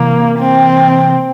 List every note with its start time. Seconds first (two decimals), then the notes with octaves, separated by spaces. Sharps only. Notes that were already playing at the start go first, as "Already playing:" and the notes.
Already playing: C3 E3 A#3
0.38 C4